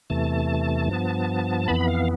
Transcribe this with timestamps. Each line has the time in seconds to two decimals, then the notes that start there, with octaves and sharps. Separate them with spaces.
0.10 E2 C3 E3 A3 A5
0.88 G2 F3 B3
1.68 F2 E3 B3 B5
1.87 F5